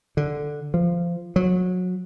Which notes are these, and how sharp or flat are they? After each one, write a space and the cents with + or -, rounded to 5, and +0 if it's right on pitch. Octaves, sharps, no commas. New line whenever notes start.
D3 +0
F3 -15
F#3 -25